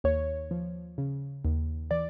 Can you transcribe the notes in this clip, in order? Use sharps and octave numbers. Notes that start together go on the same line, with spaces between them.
D#2 C#5
F3
C#3
D#2
E3 D5